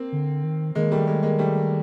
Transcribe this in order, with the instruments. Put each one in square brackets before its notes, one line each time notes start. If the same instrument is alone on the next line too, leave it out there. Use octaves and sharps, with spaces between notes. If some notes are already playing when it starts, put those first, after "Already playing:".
Already playing: [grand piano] A#3 C4
[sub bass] D3
D#3
[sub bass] D#3 [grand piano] G#3 A#3
[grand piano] G3 A3
G#3 A#3
G#3 A#3
G3 A3